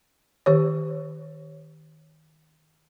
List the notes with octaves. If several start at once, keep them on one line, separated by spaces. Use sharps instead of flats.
D#3 G4 C#5